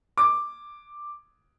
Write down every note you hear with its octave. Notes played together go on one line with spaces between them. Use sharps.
D6